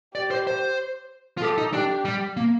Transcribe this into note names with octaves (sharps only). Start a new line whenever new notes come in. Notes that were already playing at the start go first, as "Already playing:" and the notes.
G4 D5
C5
C5
F4
G4 A4
D#4
D4 G4
G3
A#3